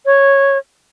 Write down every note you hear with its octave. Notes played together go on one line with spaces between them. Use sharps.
C#5